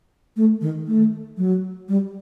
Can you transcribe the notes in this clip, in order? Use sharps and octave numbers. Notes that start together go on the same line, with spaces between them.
A3
D#3
A3
F#3
G3